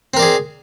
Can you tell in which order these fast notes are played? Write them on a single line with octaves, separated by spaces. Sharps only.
C4 A#4 D5 G#4